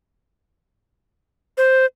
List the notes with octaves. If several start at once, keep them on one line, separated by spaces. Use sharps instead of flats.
C5